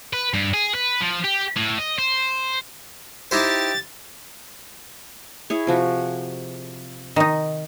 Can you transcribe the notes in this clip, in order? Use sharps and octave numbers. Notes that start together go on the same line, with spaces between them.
B4
G2
G#4
B4
F3
G4
A2
D#5
C5
D#4 E4 G4 C5 A6
E4 G#4 C#5
C3 F3 F#4
D#3 D#4